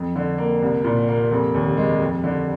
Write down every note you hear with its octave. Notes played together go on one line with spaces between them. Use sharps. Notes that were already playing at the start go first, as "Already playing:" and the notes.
Already playing: F2
D3
A#3
C2
A#2
A#3
F1
D#2
G#3
F2
D3